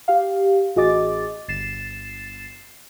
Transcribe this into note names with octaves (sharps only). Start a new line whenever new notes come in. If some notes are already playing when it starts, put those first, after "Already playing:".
G4 F5
A1 F#4 G#4 D#5 D6 A6
G1 A6 C7 E7